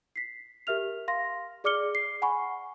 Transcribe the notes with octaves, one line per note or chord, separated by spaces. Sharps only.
B6 C7
G4 A#4 E5 F6 F7
F5 C6 A#6
G#4 D5 D6 F6 C#7 G7
C7
F#5 G#5 B5 C#6